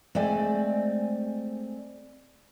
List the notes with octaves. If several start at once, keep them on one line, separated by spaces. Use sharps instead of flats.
G#3 A3 C4 D5 G#5